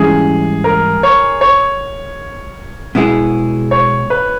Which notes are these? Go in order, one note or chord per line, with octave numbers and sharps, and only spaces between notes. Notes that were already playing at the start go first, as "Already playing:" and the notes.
Already playing: G#2 E3 G3 C#4 G#4
A#4
C#5
C#5
B2 G#3 B3 E4 G#4
C#5
B4